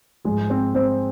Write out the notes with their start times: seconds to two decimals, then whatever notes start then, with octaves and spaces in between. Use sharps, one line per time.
0.25 G#2 F3 G#3 G#4
0.50 C4 C5
0.75 C4 C5